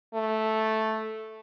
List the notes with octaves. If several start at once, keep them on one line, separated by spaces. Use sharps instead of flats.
A3